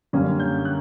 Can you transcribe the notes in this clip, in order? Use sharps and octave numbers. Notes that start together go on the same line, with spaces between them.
F#2 D3 G3 A#3 C#4
G6
F#6